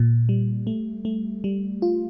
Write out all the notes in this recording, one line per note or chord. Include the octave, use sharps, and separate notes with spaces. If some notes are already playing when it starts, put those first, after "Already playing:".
Already playing: A#2
G3
A3
A3
G3
F4